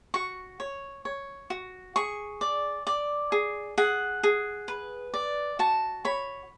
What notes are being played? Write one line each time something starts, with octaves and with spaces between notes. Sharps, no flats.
F#4 C#6
C#5
C#5
F#4
G#4 C#6
D5
D5
G#4
G#4 F#5
G#4
B4
D5
F#4 A5
C#5 B5